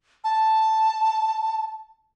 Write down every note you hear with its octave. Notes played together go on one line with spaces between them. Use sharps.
A5